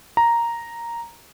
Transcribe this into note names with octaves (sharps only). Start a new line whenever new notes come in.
A#5